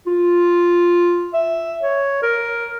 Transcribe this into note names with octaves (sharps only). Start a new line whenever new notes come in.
F4
E5
C#5
A#4